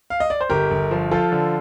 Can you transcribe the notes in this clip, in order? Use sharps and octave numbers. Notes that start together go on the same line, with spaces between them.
F5
D#5
D5
C5
G1 G4 A#4
G1
F3
F3 F4 A4
D3